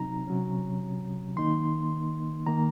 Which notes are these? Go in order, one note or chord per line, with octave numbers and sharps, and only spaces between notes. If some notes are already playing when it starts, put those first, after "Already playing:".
Already playing: C3 F#3 C4 D#4 A#5
C3 F#3 C#4
D#3 A#3 D#4 C6
D#3 A#3 A#5